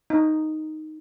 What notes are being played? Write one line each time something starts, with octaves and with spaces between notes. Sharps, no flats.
D#4